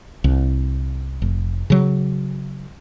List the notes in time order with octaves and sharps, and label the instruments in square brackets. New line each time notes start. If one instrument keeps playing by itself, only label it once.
[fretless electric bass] C2
F1
C#3 F#3